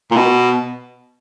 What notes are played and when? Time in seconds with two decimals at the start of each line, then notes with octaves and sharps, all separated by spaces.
0.11 A#2
0.16 B2